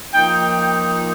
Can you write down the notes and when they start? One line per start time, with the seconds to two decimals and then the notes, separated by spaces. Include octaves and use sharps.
0.14 F3 A#3 D#4 G5
0.60 G5